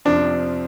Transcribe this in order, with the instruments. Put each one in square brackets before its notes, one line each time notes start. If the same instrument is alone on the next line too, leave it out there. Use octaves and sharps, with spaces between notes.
[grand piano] F2 C3 F3 C4 [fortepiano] D4